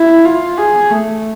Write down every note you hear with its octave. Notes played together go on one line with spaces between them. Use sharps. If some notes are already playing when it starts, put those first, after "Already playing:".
Already playing: E4
F4
G#4
A3